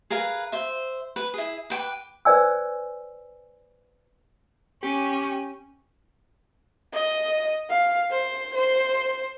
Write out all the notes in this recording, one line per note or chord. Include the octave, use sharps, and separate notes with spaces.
G#4 A#4 B4 F5
C5 E5
B4
E4 G#4
B4 G5 B5 D6
B4 C5 D5 G#5 E6
C#4 G4
D#5
F5
C5
C5